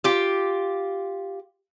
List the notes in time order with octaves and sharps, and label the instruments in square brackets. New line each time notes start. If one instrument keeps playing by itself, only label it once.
[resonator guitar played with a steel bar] F4 G4